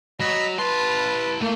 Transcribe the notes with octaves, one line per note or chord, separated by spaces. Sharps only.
F#3 D#5 B5 E6
E4 B4 A5 C6
A3 A#3